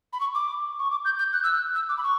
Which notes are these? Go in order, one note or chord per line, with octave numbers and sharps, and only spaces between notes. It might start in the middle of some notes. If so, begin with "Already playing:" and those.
B5
C#6
D6
C#6
D6
G6
G6
F#6
E6
F#6
E6
D6
B5
C#6